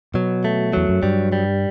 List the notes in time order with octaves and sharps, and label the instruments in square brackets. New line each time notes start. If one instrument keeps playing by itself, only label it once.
[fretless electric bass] B2 [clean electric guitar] F#3
[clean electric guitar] A3
[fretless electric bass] E2 [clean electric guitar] F#3
[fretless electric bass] F#2
[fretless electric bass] G2 [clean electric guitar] G3
[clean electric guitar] G3